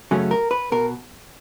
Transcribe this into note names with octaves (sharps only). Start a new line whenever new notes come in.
F#2 C#3 F#3 A3 C#4
A#4
B4
B2 A#4